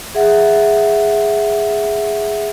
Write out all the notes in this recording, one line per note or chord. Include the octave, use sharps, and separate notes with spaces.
G#4 E5 F#5